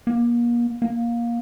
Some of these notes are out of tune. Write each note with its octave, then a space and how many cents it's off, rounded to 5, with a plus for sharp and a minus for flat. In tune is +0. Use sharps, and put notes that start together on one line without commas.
A#3 +35
A#3 +15